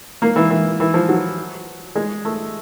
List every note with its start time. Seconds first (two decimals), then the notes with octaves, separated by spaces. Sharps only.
0.22 A#3
0.36 E3
0.50 E3
0.80 E3
0.94 F3
1.09 F#3
1.95 G#3
2.25 A3